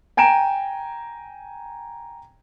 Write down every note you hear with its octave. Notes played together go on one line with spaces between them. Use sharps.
G5 G#5 A#5 D7 E7